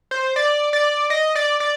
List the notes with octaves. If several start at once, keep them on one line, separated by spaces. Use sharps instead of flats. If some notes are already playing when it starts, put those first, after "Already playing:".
C5
D5
D5
D#5
D5
D5